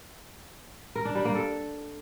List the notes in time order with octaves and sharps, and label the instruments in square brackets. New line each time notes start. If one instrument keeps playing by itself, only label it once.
[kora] A#4
D4
G3
A#3
A4